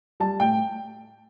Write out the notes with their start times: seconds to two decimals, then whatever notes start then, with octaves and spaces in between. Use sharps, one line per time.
0.20 G3 A5
0.40 A2 G5